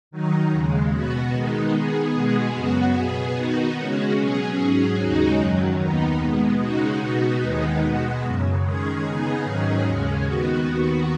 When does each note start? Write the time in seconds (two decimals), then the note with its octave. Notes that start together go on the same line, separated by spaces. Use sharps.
0.11 D#3 F#3 D#4
0.51 D#2 C#3 G#3
0.92 B2 B3 F#4
1.32 D#3 G#3 B3 D#4
1.72 D#3 B3 G#4
2.14 B2 G#3 B3 G#4
2.54 F#2 C#3 B3 F#4
2.94 B2 B3 G#4
3.35 D#3 B3 D#4 F#4
3.75 C#3 G#3 C#4 F#4
4.16 B2 F#3 C#4 G#4
4.56 G#2 F#3 C#4 G#4
4.97 D#2 C#3 G#3 D#4 F#4
5.37 F#2 D#3 F#3
5.78 D#2 D#3 B3 D#4
6.19 B2 G#3 B3
6.59 C#3 G#3 D#4 F#4
7.00 B2 B3 D#4 F#4
7.40 D#2 D#3 G#3 B3 D#4
7.81 B2 G#3 B3 F#4
8.21 F#2 C#3 F#3
8.62 D#3 G#3 C#4 G#4
9.02 C#3 B3 D#4 G#4
9.43 G#2 D#3 F#3 C#4 G#4
9.83 D#2 C#3 G#3 C#4
10.24 D#3 B3 F#4
10.64 D#2 D#3 B3 F#4